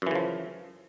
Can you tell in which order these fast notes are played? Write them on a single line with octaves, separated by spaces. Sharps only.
F#2 E3 C#3 F3